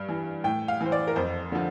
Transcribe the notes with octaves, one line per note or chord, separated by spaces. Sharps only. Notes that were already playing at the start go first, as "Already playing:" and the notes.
Already playing: G2
E3
A2 G5
F5
E3
C5
D5
A#4
F2 C5
D3 F3